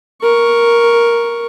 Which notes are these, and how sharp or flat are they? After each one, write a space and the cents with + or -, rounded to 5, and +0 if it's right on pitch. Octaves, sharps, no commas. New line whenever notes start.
A#4 +5 C#6 +0